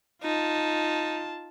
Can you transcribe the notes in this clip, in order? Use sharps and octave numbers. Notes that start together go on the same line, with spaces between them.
D#4 F4 A5